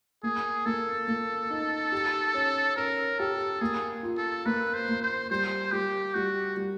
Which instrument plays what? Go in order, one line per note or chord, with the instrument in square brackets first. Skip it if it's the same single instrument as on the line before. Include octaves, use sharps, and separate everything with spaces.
[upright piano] A#3 [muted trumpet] G#4
[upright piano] A#3 [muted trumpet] A4
[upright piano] A#3
D#4
G4
C#4
[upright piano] C#4 [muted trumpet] A#4
[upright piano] G4 [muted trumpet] A4
[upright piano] A#3 [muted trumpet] G#4
[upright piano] F4
[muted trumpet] A4
[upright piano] A#3 [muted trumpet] B4
[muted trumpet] C5
[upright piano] A#3
[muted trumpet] C5
[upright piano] G3 [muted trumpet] C5
[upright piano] G3 [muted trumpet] G4
[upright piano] G3 [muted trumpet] F#4
[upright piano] G3